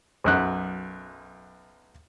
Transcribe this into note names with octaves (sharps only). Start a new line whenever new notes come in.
B1 F#2 F#6